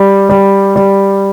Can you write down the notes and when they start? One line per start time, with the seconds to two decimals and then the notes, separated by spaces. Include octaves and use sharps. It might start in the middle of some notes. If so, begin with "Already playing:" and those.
Already playing: G3
0.29 G3
0.76 G3